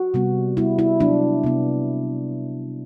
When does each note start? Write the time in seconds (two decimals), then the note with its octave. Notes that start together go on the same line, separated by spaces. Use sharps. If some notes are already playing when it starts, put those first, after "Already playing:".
Already playing: F#4
0.14 C3 G3 B3
0.57 C3 G3 B3 E4
0.79 E4
1.00 C3 F#3 B3 D4
1.44 C3 F#3 B3